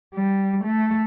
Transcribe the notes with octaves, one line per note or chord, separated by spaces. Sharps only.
G3
A3